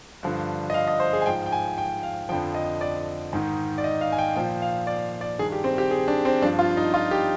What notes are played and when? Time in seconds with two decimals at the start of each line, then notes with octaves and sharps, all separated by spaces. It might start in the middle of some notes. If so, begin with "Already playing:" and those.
0.23 G2 D3 F3
0.70 D#5
0.74 F5
0.88 D#5
1.00 C5
1.13 G#4
1.22 G#5
1.26 G#2 F3 G5
1.46 G5
1.52 G#5
1.78 G5
2.03 F5
2.29 F2 D3 F3 G5
2.55 D#5
2.81 D5
3.33 G#2 D#3
3.78 D5
3.84 D#5
4.01 F5
4.12 G#5
4.18 G5
4.36 A#2 F3 G5
4.62 F5
4.87 D5
5.21 D5
5.39 G2 D#3 G#4
5.52 G4
5.64 C4
5.78 G4
5.91 G#4
6.08 D4
6.25 C4
6.41 G2 F3 D4
6.59 F4
6.77 D#4
6.94 F4
7.11 G4